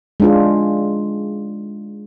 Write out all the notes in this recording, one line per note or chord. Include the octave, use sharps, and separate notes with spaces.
G#3 D4 F4